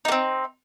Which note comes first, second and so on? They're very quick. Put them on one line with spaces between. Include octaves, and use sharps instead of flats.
D#4 A#3 C4